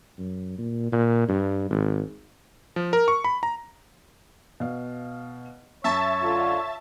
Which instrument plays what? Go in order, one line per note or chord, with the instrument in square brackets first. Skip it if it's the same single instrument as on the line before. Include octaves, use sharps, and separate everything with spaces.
[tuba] F#2
A#2
A#2
G2
G#1
[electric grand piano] F3
A#4
C#6
B5
A#5
[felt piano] B2 F5
[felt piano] F#2 A#5 C#6 [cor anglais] C#5 [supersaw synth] E5 A5 A6
[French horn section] D3 F4